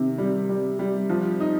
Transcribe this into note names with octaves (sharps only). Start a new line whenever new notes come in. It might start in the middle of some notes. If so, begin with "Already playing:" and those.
Already playing: C3 D#3
G3
G3
G3
F3
D#4